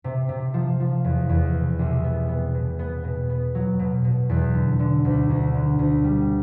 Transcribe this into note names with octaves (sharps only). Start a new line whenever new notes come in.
C3
C3
F3
F3
E2
E2
B2
C2
B3
B3
B2
B3
B2
B3
F#3
B2
B2
E2
D3
D3
D2
D2
D3
D2
G3